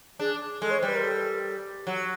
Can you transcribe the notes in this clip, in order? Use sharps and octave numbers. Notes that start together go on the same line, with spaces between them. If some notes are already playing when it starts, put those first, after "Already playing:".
D4 G#4
G#3 A4
C#5
C5
G3 B4
A#4
A4
F#3